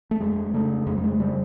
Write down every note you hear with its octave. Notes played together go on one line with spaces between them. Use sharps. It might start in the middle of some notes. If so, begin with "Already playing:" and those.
A3
F2 G#3
C#3 A3
F2 G#3
G3
G#3
C#3 G3